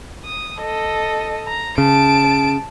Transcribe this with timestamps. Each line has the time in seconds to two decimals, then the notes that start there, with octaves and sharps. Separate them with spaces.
0.24 D#6
0.60 A4 D#5
1.47 A#5
1.78 C#3 A5 D7